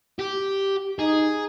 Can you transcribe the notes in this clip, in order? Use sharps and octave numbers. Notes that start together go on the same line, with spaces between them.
G4
D#4 G#4